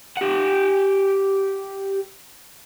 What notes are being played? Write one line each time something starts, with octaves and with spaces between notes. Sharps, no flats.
G4 F#5